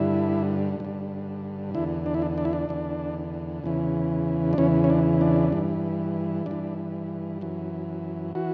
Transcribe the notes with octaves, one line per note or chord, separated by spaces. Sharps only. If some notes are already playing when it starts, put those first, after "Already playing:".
Already playing: G2 D3 E4
G2 D3
E2 D3 E4
D4
E4
D4
D4
E4
D4
E2 D3
E2 C#3 E3
D4
E2 C#3 E3 C#4
C#4
D4
D4
G2 E3
G2 E3 D4
F#2 E3
E3 F#4